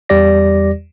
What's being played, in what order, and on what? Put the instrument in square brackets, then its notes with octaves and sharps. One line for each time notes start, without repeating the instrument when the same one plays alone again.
[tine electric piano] E2 G3 G4 D5 A#6